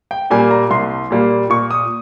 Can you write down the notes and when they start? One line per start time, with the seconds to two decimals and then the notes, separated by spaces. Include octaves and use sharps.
0.11 G5
0.30 A#2 G3 A#3 G#5
0.51 A#5
0.70 C2 C6
1.10 A#2 G3 A#3
1.50 A#2 C#6
1.71 D#6